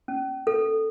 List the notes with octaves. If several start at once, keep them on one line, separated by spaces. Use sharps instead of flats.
C#4
A4